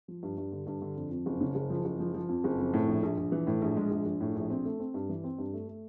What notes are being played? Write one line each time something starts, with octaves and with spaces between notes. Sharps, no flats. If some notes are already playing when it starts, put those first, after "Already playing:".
F3
G2
G2
D3
G2
D3
F2
F2
F#1
C#3
F#1
F3
F#1
F3
F3
F2
F#1
F2
A2
A#1
A#1
A#1
E3
A2
A#1
G#3
A#1
A#1
A2
A#1
C4
A3
C4
G2
E3
C4
G2
A3
A3